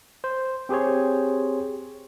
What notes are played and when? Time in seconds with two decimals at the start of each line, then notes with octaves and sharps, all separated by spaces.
0.24 C5
0.69 C4 G4 G#4 C5 C#5